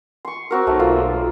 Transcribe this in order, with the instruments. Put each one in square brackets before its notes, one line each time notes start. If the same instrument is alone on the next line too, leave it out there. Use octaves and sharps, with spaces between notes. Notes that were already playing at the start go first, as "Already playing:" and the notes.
[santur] C6 C#6
C4 F#4 A#4
[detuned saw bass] B1 [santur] A3
[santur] A#3 F4